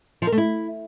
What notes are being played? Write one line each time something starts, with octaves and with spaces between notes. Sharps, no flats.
F3
A#4
A3
E4